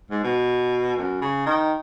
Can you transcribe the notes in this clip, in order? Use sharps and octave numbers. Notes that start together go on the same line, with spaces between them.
G#2
B2
F#2
C#3
D#3